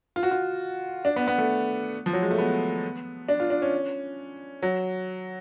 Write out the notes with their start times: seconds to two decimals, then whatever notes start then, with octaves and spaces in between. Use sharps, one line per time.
0.16 F4
0.23 F#4
0.31 F4
1.05 D4
1.16 B3
1.28 B3
1.38 A3
2.06 F3
2.13 F#3
2.22 G#3
2.31 A3
2.38 B3
3.29 D4
3.40 F4
3.50 D4
3.62 C#4
4.62 F#3